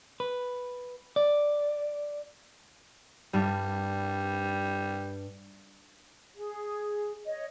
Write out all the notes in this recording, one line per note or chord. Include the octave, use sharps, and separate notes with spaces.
B4
D5
G2 G3
G#4
C#5 D#5